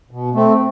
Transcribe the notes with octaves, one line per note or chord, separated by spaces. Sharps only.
B2
A3 C4